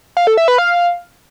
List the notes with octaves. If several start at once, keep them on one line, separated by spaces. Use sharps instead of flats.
F5
A4
E5
B4
F5